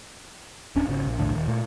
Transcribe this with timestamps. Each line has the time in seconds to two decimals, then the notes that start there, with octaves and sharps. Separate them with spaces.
0.76 D1 C#4 D4
0.88 G#1 C#3
1.06 A#1
1.19 B1 E2 A2 D3
1.36 D#1 D#3
1.48 A#2 A3